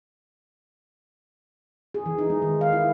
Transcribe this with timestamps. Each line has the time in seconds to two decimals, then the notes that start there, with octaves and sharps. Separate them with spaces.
1.94 G#4
2.06 E3
2.18 D#4
2.30 G#3
2.42 D#3
2.61 F5
2.73 E4